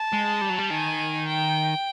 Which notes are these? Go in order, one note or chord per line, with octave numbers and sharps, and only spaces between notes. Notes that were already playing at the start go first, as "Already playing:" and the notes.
Already playing: A5
G#3
G3
F#3
G3
D#3 G#5
G5